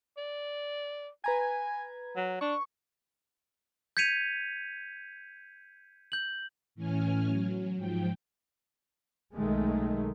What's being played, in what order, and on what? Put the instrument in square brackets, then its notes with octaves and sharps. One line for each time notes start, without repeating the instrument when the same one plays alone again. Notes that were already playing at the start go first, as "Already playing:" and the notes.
[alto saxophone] D5
[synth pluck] B4 A#5 G#6 [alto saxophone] G#5
[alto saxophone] F#3
[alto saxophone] D4 [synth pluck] C#6
[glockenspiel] G6 G#6 B6 C#7 D#7 F7
G6 F#7
[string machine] A2 E3 C#4 G#5 F6
F#3
G#2 F3 G5
[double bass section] B1 D#3 G#3 A3